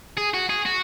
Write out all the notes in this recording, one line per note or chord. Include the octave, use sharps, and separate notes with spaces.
G#4
F#4
G#4
F#4